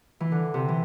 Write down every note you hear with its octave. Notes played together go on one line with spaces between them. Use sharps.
E3
D3
C3
E3